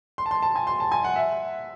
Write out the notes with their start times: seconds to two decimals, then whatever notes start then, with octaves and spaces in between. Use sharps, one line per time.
0.18 C6
0.26 A5
0.31 C6
0.42 A5
0.56 G#5
0.67 C6
0.80 A5
0.92 G#5
1.04 F#5
1.16 E5